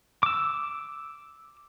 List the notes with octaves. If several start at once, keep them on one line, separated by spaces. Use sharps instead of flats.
D6 E6